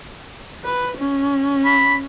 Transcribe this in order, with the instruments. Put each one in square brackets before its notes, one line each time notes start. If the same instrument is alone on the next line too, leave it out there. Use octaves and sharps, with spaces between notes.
[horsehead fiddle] B4
C#4
[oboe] B5